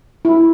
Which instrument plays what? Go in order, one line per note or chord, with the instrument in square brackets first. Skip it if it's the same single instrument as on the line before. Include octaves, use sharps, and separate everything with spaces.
[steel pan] E4